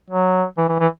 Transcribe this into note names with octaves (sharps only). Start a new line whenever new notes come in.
F#3
E3
E3
E3